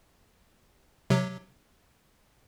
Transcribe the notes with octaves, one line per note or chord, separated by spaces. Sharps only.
C3 F#3